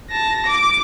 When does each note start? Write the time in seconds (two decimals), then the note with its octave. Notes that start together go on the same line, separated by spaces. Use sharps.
0.10 A5 A#6
0.46 D6